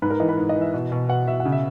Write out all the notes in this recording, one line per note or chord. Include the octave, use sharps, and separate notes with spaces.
G#2 B4
A#4
E3 D#5
B4
G#2
D#5
E3
E5
B2
B2
B2 F#5
B2 E5
F#5
C#3
E5